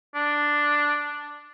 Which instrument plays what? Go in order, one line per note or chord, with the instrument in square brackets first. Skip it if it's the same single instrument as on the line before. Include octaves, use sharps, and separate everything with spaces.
[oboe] D4